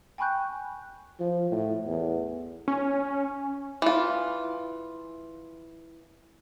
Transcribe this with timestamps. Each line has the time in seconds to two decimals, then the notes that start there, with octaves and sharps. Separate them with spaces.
0.18 G5 G#5 B5 C#6 F#6 G6
1.20 F3
1.51 A2
1.86 E2
2.68 C#4
3.82 E3 F4